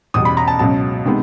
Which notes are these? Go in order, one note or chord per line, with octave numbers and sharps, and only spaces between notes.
E2 B2 G3 D#6
B5
A#5
A5
C#2 B2 F#3 A5
C3 D#3 G#3 B3